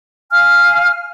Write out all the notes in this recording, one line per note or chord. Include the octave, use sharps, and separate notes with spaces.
F5 G#5 F6